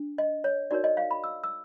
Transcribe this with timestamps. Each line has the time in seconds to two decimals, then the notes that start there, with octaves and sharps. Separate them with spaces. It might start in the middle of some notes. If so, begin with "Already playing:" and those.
Already playing: D4
0.18 D#5
0.44 C#5
0.71 D#4 F#4 A#4 C#5 D5
0.84 D#5
0.97 F5
1.11 B5
1.24 E6
1.44 E6